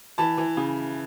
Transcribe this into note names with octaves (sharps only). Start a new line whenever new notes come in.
E3 A5 B5
E3
C#3